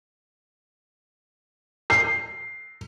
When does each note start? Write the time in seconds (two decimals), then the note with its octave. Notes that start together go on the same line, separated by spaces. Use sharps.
1.90 C7